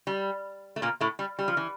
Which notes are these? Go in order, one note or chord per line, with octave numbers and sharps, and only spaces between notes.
G3
A3
A#2 A#3
A2 A3
G3
G3
F3
E3